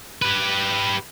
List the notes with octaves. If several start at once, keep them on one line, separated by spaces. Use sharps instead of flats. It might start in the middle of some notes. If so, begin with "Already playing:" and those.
G4 B4